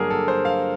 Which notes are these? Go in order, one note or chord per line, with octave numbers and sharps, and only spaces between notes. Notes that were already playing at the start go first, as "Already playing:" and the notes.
Already playing: G2 D3 F#3 A#3 D4 G#4 A#4
A4
C5
F5